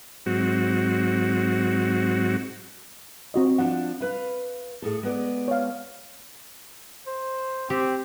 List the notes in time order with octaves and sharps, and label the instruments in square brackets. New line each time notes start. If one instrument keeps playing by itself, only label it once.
[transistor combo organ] G#2 F#3 C4 F#4
[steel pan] C4 F#4 D#5
[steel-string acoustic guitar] F3 D4 [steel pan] F#5
[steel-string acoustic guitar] E4 B4 F5
A2 G#4 A4
G#3 B3 D5
[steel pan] C#5 F5
[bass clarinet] C5
[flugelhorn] C4 [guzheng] G4